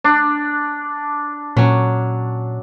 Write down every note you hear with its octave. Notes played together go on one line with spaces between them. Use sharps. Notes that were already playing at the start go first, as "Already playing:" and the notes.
D4
A#2 F#3 C#4